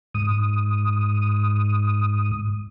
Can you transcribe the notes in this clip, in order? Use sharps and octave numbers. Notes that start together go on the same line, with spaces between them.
G#2 D#6